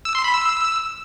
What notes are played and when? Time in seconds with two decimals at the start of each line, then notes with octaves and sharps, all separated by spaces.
0.05 E6
0.15 C6
0.24 B5
0.34 E6